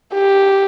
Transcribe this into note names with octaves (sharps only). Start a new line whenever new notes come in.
G4